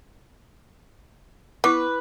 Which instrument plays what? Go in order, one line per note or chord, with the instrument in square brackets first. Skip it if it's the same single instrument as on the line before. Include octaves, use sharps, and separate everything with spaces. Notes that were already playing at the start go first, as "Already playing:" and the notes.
[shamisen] B3 [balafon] E4 D6 [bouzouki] B4